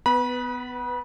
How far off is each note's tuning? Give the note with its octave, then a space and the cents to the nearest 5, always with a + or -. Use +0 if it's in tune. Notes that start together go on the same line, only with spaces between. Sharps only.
B3 +20 B4 +0 B5 -30